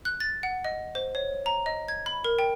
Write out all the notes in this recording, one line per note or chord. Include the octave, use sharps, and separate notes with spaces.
F#6
A6
F#5
D#5
C5
C#5
A#5
D#5
G#6
B5
A#4
G5